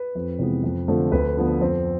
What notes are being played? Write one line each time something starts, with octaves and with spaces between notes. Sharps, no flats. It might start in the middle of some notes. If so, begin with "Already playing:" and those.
Already playing: B4
F2
C3 E3 G#3 B3
F2
D3 F3 A3 C4
D2 B4
D3 F3 B3
F2 C4